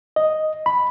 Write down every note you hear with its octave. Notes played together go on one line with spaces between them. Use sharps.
D#5
B5